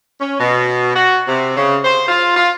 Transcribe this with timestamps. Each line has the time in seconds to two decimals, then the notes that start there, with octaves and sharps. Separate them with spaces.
0.20 C#4
0.40 B2
0.95 F#4
1.28 C3
1.56 C#3
1.84 C5
2.08 F4
2.36 F4